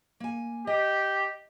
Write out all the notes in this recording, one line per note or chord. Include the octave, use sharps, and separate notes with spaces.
A#3 G#5
G4 D#5